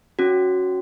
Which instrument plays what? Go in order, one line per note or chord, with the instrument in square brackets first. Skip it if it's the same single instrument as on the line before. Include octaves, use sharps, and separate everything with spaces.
[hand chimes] C#4 F#4